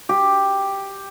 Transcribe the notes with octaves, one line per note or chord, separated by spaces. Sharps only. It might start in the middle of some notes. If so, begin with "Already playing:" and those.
G4